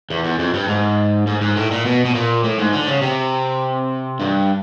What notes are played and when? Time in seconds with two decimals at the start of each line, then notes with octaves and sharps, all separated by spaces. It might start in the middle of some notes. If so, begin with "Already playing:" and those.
0.10 E2
0.24 E2
0.39 F2
0.54 G2
0.68 G#2
1.27 G#2
1.41 G#2
1.56 A2
1.71 A#2
1.86 B2
2.05 B2
2.15 A#2
2.44 A2
2.59 G#2
2.73 D3
2.88 C#3
3.02 C3
4.20 G2